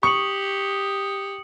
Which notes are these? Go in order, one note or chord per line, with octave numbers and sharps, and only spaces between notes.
G4 C#6 D#6 C#7 F#7